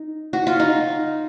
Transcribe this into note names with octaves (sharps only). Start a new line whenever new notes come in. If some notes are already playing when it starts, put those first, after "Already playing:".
Already playing: D#4
F#4
F4
D#4